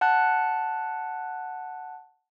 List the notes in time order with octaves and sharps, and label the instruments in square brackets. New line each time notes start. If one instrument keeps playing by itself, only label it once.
[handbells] F#5 A5 F#6